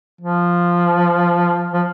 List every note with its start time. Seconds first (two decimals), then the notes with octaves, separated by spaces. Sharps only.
0.21 F3
1.73 F3